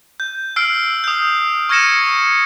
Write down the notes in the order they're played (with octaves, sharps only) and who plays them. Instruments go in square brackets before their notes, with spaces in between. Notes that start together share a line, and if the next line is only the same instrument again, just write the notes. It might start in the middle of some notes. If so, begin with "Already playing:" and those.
[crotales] G6
E6 F6 C7 D7
D#6 G6
C#6 F6 G#6 A#6 C#7 E7